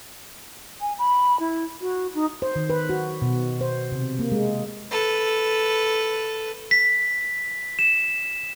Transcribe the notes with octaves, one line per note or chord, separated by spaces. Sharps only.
G#5
B5
E4
F#4
D#4
C5
D#3
B4
F#4
B2
C5
C3
A#3
G#3
A4 B4
B6
E7